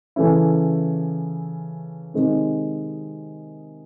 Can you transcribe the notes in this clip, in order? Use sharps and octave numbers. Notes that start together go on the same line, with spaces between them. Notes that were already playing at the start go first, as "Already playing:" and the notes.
C#3 E3 A3 C#4 E4
C3 D#3 G#3 C4